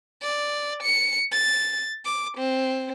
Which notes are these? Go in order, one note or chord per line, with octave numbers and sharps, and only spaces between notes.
D5
C#7
A6
D6
C4